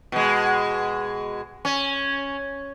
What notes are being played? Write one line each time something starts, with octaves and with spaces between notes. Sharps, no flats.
B2 G#3
C#4